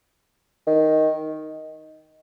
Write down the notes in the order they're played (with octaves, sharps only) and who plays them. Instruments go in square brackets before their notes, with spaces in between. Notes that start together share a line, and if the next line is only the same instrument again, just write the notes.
[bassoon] D#3